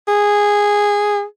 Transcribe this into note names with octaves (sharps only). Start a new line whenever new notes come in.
G#4